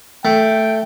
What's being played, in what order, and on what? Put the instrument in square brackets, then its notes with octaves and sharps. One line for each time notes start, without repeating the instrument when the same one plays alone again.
[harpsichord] A3 [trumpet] G5